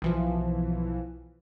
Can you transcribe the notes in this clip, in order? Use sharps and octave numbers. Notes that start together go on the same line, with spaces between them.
B1 E3 F3